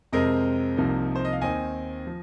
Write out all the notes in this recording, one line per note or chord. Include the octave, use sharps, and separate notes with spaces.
F2 C3 G#3 C4 A#4 D#5
C2 C3 F3 A#3 D#4
C5
D#5
F5
D#2 D#3 C4 D#4 D#5 G#5
F3